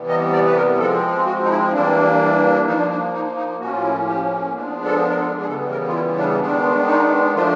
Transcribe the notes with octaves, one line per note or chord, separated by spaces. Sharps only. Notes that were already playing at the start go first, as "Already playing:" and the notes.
Already playing: C3 E3 G3 B3
D#5
D5
B4
A#4
F3 G#3 C4 A4
F#4
D#4
E4
E3 G3 A#3 D4
F3 A#3 D4 D#4
D4
D#4
D#4
A2 F3 A#3 C#4 F#4
F4
E4
F4
G4
F3 G#3 B3 D4
A4
A#4
A4
G#4
C#3 E3 G3 B3 A4
A#4
F4
E4
D4
D#3 G#3 B3 D4
D#4
F3 A3 D4 F4